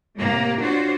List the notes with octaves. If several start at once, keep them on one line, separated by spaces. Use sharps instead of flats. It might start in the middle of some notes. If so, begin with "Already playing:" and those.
A2 C3 A#3 G4
D4 F4 F#4 C5 C#5